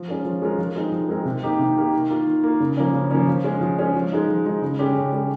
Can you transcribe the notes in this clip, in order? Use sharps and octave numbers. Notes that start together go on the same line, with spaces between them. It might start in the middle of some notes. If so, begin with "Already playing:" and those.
Already playing: F3
G#3 C#4 F4 A#4
F3
G#3 C#4 F4 A#4
F3
G#3 C4 D#4 A#4
F3
G#3 C4 D#4 A#4
C3
D#3 A#3 D#4 G4
C3
D#3 A#3 D#4 G4
D#3
A#3 F4
D#3
A#3 F4
C#3
F3 A#3 C#4
C#3
F3 A#3 C#4
F3
G#3 C#4 G#4
F3
G#3 C#4 G#4
F3
G#3 D#4
F3
G#3 D#4
C#3
G#3 C#4 G4
C#3
G#3 C#4 G4